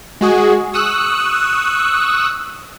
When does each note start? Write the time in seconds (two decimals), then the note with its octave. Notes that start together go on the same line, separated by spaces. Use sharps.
0.21 G#3 F#4 G#4
0.73 C#6 D#6 E6 F#6